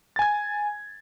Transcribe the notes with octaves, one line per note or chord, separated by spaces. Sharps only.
G#5 G#6 A6